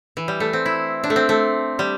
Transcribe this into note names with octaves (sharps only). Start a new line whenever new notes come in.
E3
G3
A3
C4
E4
D4
A3
C4
A3
G3